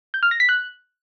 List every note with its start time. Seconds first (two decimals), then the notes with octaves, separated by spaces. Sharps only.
0.14 G6
0.23 F6
0.31 A#6
0.40 B6
0.49 F#6